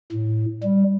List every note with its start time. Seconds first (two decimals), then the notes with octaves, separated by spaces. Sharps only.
0.12 A2
0.63 G3